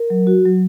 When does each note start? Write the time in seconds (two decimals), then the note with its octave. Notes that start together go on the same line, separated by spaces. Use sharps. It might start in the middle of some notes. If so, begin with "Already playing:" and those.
Already playing: A#4
0.10 F#3
0.27 F#4
0.45 F#3